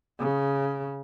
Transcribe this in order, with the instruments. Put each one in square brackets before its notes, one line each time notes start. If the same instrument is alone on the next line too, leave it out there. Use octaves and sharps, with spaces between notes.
[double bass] C#3